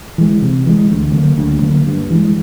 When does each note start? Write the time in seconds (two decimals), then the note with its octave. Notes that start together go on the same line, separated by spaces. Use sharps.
0.18 E3 G#3
0.42 C3
0.66 E3 G#3
0.91 D2
1.13 D3 F#3 A#3
1.38 D2
1.62 D3 F#3 A#3
1.87 G2
2.11 E3 G#3